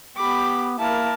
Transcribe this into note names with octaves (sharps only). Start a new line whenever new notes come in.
B3 G4 B5 D6
A#3 E4 A#4 A5